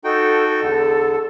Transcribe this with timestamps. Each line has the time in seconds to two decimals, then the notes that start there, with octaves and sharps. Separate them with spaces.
0.04 D#4 F#4 A4 G5
0.49 A4
0.62 E2 D3